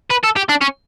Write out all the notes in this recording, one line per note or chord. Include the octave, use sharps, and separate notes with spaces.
B4
A4
G4
D4
C#4